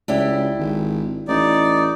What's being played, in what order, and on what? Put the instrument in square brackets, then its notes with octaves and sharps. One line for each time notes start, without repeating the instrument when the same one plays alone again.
[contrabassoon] C#2 [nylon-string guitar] D4 E4 G4
[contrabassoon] G#1
[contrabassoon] A1 [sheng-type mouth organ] D#4 D5